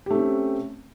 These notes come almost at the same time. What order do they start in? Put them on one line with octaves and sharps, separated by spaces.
G4 A3 C4 C#4